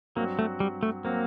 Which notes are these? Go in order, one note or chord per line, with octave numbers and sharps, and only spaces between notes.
G2 F#3 A#3 C4 F#4
A3
G3
A3
F#3 A#3 C4 F#4